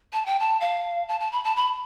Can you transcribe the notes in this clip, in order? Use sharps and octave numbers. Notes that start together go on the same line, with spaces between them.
A5
G5
A5
F5
A5
A5
B5
A5
B5